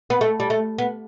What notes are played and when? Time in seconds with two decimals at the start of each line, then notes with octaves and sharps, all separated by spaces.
0.10 B3
0.21 A3
0.40 G3
0.50 A3
0.78 B3